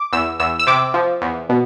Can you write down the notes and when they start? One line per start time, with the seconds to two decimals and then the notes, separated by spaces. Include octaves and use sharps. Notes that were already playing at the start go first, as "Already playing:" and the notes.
Already playing: D6
0.13 E2 E6
0.39 E2 E6
0.59 E6
0.67 C3 D6
0.94 F3
1.22 E2
1.49 B2